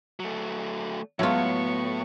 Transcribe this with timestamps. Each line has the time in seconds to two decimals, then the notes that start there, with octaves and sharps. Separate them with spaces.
0.20 F#3 A3
1.19 A2 F#3 G#3 B3 F4 F#4 E5 C#6